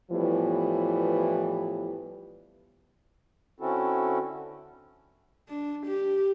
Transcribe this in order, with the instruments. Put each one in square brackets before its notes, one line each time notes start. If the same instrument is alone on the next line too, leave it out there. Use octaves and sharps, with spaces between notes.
[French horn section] A2 E3 F3 G3 B3
[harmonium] D3 C4 C#4 E4 F#4 A4
[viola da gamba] D4
G4